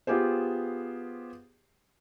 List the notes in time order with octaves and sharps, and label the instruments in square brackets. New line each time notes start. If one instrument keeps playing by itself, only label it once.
[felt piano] B3 F4 G4 G#4 C5